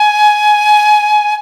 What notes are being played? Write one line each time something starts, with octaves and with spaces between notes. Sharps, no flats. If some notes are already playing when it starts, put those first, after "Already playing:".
Already playing: G#5